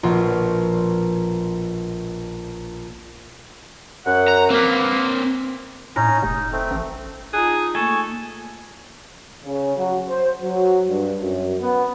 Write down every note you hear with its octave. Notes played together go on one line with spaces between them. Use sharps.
A#1 B2 F4 D5
F#2 F#5
A#5
A#3 C4 B4
A2 C#4 D#4 A#5
F1 D#4
A3 C4
A1
D#4 F4 G#4 A5 F#6
A3 A#3 A4 G#5 C#6
C#3
F#3
C5
F#3
G2
F#2
B3